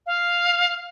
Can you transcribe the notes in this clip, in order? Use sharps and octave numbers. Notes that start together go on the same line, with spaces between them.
F5